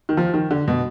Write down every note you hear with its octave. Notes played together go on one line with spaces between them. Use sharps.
D#3
F3
D#3
D3
B2